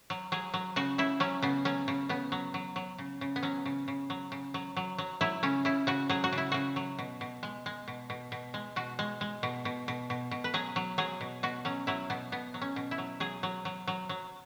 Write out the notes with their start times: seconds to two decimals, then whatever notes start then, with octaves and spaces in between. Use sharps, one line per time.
0.10 F#3
0.32 F#3 G#4
0.54 F#3
0.76 C#3 F#4
0.98 C#3 E4
1.20 F#3 C#4
1.42 C#3 B3
1.65 F#3 C#4
1.88 C#3
2.09 C#3 B3
2.32 F#3
2.54 F#3
2.76 F#3
2.98 C#3
3.21 C#3
3.36 B3
3.43 F#3 C#4
3.66 C#3
3.88 C#3
4.10 F#3
4.32 C#3
4.54 F#3
4.77 F#3
4.98 F#3
5.21 F#3 E4
5.43 C#3 C#4
5.65 C#3 E4
5.87 C#3 F#4
6.09 F#3 G#4
6.24 F#4
6.32 C#3
6.38 E4
6.52 C#3 F#4
6.76 F#3
6.99 B2
7.21 B2
7.43 G#3
7.66 G#3
7.88 B2
8.10 B2
8.32 B2
8.54 G#3
8.76 B2 F#4
8.99 G#3
9.21 G#3
9.43 B2
9.65 B2
9.88 B2
10.10 B2
10.31 B2
10.44 B4
10.54 F#3 G#4
10.76 F#3
10.98 F#3 G#4
11.21 B2
11.43 B2 F#4
11.65 F#3 C#4
11.87 F#3 E4
12.10 B2 B3
12.32 B2 B3
12.54 F#3
12.61 C#4
12.76 B2
12.91 E4
12.98 F#3
13.20 F#3 G#4
13.43 F#3
13.65 F#3
13.87 F#3
14.09 F#3